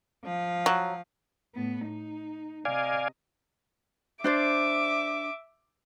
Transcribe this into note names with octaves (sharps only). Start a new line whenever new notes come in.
F3 F5
F#3
A2 B3
D#4
C3 D5 D#5 F5 G#5
D4 C5 D5 E5 D6